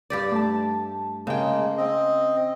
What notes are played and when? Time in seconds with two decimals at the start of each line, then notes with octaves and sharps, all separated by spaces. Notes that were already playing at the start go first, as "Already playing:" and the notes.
0.10 G2 G4 D5
0.32 A3 A5
1.27 C#3 G#3 A#3 G5
1.78 C4 D#5